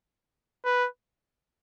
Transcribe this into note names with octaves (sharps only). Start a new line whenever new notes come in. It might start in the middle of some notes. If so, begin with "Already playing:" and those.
B4